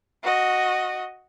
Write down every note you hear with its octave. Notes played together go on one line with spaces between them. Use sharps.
F#4 D#5